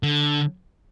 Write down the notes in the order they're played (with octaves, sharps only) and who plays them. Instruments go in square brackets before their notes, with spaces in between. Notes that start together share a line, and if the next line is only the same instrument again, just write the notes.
[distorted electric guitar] D3